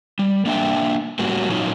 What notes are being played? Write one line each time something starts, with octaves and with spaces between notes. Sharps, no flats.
G3
A#3 D4 E5 G5
A2 F#3 G3 A#3 C#4 F#4
A#2 F#3 C#4 D#4 F4